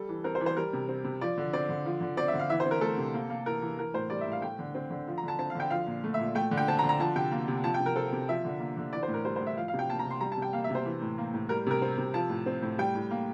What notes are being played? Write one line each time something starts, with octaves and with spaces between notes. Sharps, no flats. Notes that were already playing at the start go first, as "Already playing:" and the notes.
Already playing: G3 A4
E3
C4 A#4
C5
E3
C5
G3 A#4
C3
C4
C3
F3 D5
D3
C4 D5
D3
F3
D3
C4 D5
E5
D3
F5
E3 E5
C5
C4
A#4
A3 A4
C3
A#3
A#3
E3 A#4
E3
E3 A#4
A2 C5
G3 D5
E5
A2 F5
A3 G5
D3
C4
D3
F3
A#5
D3 A5
C4 A5
F5
D3 G5
F3 F5
A#2
A3
E5
A#2
A3 G5
D3
G5
C4 A5
A#5
D3
A#5
F3 A5
C3 G5
A#3
C3
F3 A5
G5
C3
A#4
C4 A4
C3
F3 E5
D3
A#3
D3
E3 D5
C5
A2
A#4
G3 C5
C5
A2
E5
F3 F5
F5
C3
G5
A#3 A5
A#5
C3
C6
G3 A#5
A5
C3
G5
A#3 F5
E5
C3 C5
E3
A2
A#3
A2
G3 A#4
C3 A#4
C4
C3
F3 A5
A2
C4
A2
G3 G5
A2
A#3